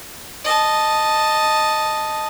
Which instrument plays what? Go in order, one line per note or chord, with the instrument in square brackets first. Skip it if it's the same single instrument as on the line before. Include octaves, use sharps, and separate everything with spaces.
[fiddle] D#5 A5